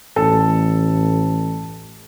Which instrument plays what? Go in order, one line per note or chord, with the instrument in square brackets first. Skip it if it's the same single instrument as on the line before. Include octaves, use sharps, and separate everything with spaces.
[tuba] A1 [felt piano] A4